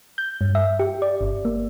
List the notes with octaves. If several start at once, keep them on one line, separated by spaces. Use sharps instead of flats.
G6
G2
E5
G4
D5
G1
A#3